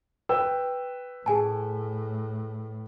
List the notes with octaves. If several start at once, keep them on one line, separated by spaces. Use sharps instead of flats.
B4 G5 E6
A2 G#4 G#5 A5